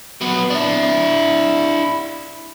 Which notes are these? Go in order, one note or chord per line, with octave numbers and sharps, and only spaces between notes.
F#3 B3
D4 E4